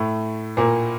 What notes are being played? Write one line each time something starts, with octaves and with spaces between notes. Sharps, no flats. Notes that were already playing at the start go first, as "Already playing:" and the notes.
Already playing: A2 A3
A#2 A#3